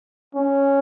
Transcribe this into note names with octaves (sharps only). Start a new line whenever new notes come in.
C#4